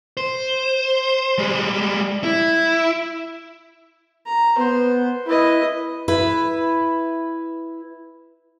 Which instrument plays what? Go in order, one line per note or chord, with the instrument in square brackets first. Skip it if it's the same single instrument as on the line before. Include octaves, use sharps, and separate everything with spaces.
[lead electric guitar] C5
G3 G#3
E4
[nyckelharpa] A#5
[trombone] B3 [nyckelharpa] C5
[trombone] E4 [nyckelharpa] B4 D#5
[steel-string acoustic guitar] E4 B4